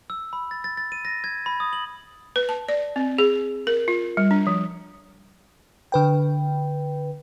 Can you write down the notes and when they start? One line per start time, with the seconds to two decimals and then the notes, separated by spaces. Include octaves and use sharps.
0.10 E6
0.33 B5
0.51 A6
0.64 A6
0.77 A6
0.92 D#7
1.05 A#6
1.24 G#6
1.46 B5
1.60 D#6
1.73 F#7
2.36 B4
2.49 A5
2.69 D5
2.96 C4
3.18 G#4
3.67 A#4
3.88 F4
4.17 G3
4.31 D4
4.47 F3
5.92 D3 B4 G5